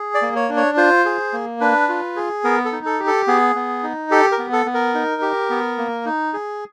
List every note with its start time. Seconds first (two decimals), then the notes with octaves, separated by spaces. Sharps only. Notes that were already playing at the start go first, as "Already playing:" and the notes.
Already playing: G#4
0.15 D5
0.22 A#3
0.36 C#5
0.49 D4
0.57 C#5
0.77 F4 C5
1.05 G#4
1.33 A#3
1.60 D4 B4
1.89 F4
2.16 G#4
2.44 B3 A#4
2.65 A4
2.72 D#4
2.86 A4
3.00 G4
3.07 A4
3.27 B3 G#4
3.55 B3
3.83 D#4
4.11 G4 A4
4.32 A#4
4.39 B3
4.52 A4
4.66 B3
4.74 A#4
4.94 D#4
5.22 G4
5.50 B3
5.78 A#3
6.05 D#4
6.33 G#4